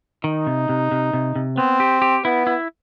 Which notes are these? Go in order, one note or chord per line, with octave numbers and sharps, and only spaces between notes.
D#3 D#4
C3
C3
C3
C3
C3
B3 C4
G4
G4
B3 E4
E4